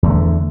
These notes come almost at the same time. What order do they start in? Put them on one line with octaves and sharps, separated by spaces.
E2 A3 D3